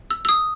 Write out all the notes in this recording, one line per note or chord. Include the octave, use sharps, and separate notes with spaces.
E6
E6
D#6